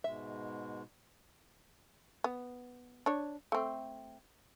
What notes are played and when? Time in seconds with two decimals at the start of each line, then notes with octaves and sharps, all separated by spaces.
0.04 G#2 B2 G#3 E5
2.24 B3
3.06 D4 C#5
3.52 A3 C4